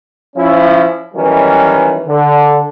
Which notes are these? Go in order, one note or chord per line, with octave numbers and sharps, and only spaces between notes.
F3 C#4 E4
D#3 E3 F#3 G3 B3 C#4
D3